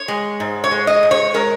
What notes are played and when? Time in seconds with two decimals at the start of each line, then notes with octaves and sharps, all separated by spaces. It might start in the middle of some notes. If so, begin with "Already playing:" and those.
Already playing: C#5
0.08 G#3
0.40 G#2
0.64 C#5
0.71 G#3
0.87 D#5
1.03 G#2
1.11 C#5
1.34 G#3 A#4